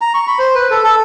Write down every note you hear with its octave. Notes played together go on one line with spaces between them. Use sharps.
A#5
C#6
B5
C5
B4
A4
A4